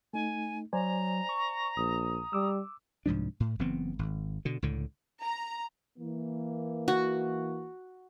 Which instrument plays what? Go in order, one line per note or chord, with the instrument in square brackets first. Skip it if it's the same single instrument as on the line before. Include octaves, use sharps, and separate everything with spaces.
[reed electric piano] A3 D#4 [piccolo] G#5
[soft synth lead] F#3 [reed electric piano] C5 D5 G#5 [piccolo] A#5
[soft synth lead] C#6
[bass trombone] A#1 [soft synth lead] D#6
[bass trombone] G3 [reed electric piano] D6 E6
[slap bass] C2 G#2 F3 D4
A2
F#1 E3 B3 C4
G#1
B2 D3
C#2 A2 D3
[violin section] A#5
[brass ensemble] E3 A#3
[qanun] F#4